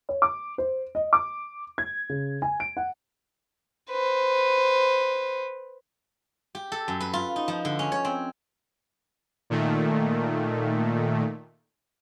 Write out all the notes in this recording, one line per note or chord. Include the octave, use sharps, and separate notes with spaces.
C#5
D6
C5
D#5
D6
G#6
C#3
G#5
D7
F#5
B4 C5
G4
A4
F#2
B4
F4
D#4
F3
D3
C#4
C#5
C4
A#2 D#3 A3